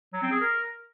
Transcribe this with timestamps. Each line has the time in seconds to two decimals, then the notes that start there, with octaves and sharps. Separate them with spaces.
0.13 F#3
0.22 C4
0.31 G#4
0.40 A#4